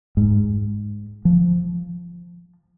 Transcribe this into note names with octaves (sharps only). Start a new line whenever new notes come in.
G#2
F3